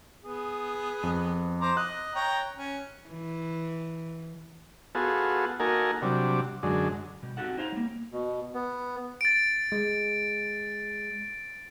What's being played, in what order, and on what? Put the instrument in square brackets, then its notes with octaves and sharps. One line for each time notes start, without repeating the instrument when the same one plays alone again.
[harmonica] B3 G#4
[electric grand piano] F2
[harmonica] C5 A#5 D6
[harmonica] D#5 [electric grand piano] F#6
[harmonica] C#5 G5 A#5
C#4
[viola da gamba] E3
[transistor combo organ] B3 F4 F#4 G#4 A4
A#3 D#4 F#4 A4 A#4 G#5
C3 F#3 G3 D4
F#2 D3 G#3
[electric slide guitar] B2 G3
C4 D#4 F#4 G4 A4 F#5
D#4 C5 C#5 F5 G#5 A#5
G3 A#3
[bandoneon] B2
B3
[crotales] A6 D7
[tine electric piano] G#3